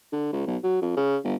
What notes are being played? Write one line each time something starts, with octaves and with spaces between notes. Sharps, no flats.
D3
C#2
B1
F#3
F2
C#3
G1